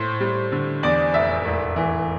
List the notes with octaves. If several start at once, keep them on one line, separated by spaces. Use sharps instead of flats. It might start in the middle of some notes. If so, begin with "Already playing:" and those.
Already playing: A2 C5
G3
D3
E2 D5
F1 E5
E1
E3